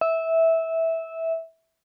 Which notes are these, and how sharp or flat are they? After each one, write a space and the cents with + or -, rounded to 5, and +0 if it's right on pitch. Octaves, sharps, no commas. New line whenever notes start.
E5 -15